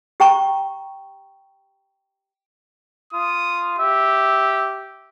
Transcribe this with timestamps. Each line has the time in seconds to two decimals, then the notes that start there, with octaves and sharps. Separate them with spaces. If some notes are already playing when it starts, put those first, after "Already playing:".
0.20 G4 G5 A#5 C#6
3.13 F4 D#6
3.79 G4 E5